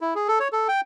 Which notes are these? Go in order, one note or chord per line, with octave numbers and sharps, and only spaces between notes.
E4
G#4
A4
C#5
A4
G5